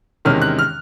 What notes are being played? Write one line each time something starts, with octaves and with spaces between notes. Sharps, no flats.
E2 C3 D#3 G#3 C#4 F6
F#6
F6